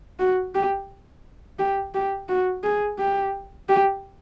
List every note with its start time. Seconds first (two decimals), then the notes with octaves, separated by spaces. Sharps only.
0.19 F#4
0.55 G4
1.59 G4
1.94 G4
2.29 F#4
2.64 G#4
2.99 G4
3.69 G4